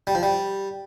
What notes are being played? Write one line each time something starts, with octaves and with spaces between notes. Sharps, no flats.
G3
F3
G3